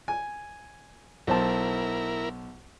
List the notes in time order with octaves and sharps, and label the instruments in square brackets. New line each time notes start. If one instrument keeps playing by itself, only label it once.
[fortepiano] G#5
[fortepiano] B1 C5 A5 [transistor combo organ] E4 A#4